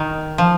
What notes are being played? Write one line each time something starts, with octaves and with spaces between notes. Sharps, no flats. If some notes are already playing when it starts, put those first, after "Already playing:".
Already playing: D#3
F3